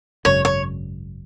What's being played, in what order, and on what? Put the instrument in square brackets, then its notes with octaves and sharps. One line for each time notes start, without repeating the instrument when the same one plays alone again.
[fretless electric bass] G#1 F#2 C#3 [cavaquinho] C#5
[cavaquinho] C#5